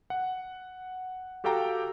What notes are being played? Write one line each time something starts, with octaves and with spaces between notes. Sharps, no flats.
F#5
F#4 G4 A4 F5 G5 A#5